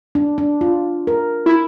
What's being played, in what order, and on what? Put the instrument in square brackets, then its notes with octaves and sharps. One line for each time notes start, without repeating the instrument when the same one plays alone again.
[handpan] D4
D4
F4
A#4
[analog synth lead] E4